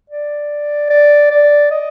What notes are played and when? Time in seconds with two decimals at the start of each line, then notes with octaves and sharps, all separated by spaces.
0.10 D5
0.90 D5
1.30 D5
1.71 D#5